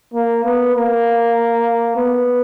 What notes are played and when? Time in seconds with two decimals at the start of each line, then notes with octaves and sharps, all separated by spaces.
0.14 A#3
0.44 B3
0.76 A#3
1.96 B3